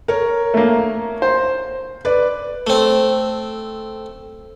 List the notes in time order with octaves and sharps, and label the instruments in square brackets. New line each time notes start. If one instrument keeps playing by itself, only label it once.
[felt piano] A#4 C#5
[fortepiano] A3 A#3
C5
[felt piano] B4 D5
[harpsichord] A3 C4